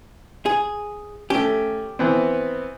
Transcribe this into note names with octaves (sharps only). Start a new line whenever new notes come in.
G#4
A3 C#4 G4
E3 B3 C4